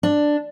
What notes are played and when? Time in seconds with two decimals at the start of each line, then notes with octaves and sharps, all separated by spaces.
0.03 D4